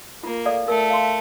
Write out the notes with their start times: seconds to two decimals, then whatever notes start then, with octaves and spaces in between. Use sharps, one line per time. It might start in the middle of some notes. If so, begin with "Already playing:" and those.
0.23 A#3 F4
0.45 A4 D5 F5
0.67 A3 A#4
0.90 F5 C6